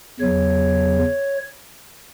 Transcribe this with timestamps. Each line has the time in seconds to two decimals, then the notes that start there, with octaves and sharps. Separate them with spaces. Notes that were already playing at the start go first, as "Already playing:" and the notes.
0.20 E2 C#3 F#3 C#5